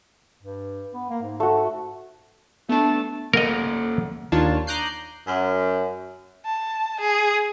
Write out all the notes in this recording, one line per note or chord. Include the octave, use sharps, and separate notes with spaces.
G2
B3
A#3
G#2
A3 F#4
A3 B3 D4 A5
A#3 A4 A#4 D#5 F#5
D#2 D#3 D4 F4 C#5 A5
A#5 D6 D#6 F#6 G6 C7
F#2
A5
G#4